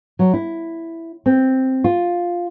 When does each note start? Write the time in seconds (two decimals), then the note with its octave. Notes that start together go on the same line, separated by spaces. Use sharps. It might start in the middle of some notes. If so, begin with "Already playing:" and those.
0.19 F#3
0.34 E4
1.26 C4
1.84 F4